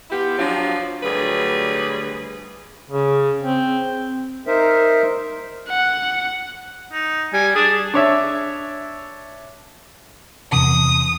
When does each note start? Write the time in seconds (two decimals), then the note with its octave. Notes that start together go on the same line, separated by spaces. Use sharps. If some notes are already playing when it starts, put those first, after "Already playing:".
0.10 B3 E4 F4 G4
0.38 F3 F#3 C4 D4 F4
1.03 D2 F#3 G3 G#4 B4
2.90 C#3
3.42 C4
4.47 D#4 A#4 C5 E5
5.69 F#5
6.92 D#4
7.33 G3 G#5
7.55 D4 G#4
7.94 D4 C#5 E5
10.52 E2 C3 D#6